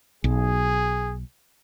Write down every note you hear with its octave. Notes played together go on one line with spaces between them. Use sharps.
B1 G#4